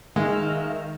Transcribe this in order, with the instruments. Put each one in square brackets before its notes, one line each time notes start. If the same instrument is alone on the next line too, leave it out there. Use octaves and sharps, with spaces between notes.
[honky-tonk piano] D#3 [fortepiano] G#3 [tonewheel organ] A#4 E5 F5